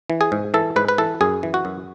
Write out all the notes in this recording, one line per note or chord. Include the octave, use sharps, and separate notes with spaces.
E3
G#4
G#2
E3 A4
G#2 B4
B4
E3 A4
F#2 G#4
E3
F#4
F#2